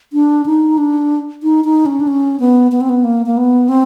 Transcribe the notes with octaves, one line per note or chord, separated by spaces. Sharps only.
D4
D#4
D4
D#4
D#4
C#4
D4
C#4
B3
B3
C4
B3
A#3
A#3
B3
C4